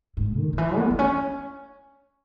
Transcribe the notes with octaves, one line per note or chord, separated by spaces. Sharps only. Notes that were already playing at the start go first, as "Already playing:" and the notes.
G#2
D#3
D#3
E3
B3
B3
C#4